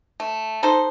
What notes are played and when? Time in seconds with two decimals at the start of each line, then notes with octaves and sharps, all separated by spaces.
0.20 A3
0.63 D#4 A4 C5